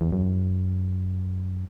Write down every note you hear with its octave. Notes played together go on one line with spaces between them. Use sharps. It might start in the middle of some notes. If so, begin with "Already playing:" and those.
E2
F#2